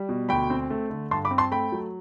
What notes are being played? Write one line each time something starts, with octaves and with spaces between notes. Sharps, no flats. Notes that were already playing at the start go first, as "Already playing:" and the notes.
Already playing: G3
B2
D2 G5 B5
C4
A3
D3
G2 A5 C6
B5 D6
C4
A5 C6
A3 G5 B5
F#3